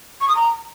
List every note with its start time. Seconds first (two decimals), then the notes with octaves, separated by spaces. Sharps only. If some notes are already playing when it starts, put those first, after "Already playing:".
0.21 C#6
0.28 D#6
0.35 A#5